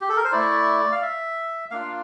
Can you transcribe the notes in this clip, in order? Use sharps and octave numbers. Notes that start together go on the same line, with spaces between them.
G4
A4
A#4
C5
A3 E4 D5
F5
E5
A#3 D4 F4 F5